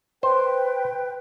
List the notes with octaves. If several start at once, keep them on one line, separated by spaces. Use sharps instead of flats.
B4 C5 G5